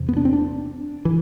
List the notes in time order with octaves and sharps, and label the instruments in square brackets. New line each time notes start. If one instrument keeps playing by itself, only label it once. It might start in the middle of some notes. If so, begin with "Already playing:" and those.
Already playing: [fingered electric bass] E2 C3
B3
D4
C4
D4
E3